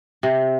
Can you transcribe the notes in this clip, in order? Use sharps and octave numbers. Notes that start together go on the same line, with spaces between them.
C3